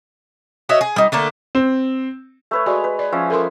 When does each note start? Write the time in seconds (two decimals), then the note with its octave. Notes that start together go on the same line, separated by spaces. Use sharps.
0.69 F#4 C#5 D#5 E5
0.81 G#4
0.96 G3 D#4
1.12 D3 A3 A#3 D4
1.55 C4
2.51 A3 B4 C#5
2.66 G#3 F#4 D5
2.84 B4
2.99 D5
3.12 F3 C#4 E5
3.30 F3 A4 A#4 G#5 C6